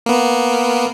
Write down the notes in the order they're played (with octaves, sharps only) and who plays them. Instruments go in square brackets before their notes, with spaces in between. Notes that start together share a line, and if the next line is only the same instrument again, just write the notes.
[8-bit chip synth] A#3 B3